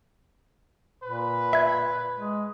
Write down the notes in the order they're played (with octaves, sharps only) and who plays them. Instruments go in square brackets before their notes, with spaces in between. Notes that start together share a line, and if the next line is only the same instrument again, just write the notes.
[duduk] A#2 [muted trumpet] B4
[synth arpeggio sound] E5 G#6
[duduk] G#3